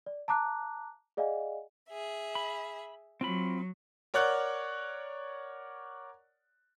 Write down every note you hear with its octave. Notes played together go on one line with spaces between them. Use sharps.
D5
A5 A#5 D6 F#6
G#4 D5 D#5 F5 F#5 G#5
G#4 E5
B5
F#3 C4 F4 B5
A#4 C#5 D5 F#5 F#6